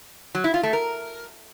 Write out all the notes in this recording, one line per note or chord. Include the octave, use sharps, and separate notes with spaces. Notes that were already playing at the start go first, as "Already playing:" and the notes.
F#3
E4
F4
A3
A#4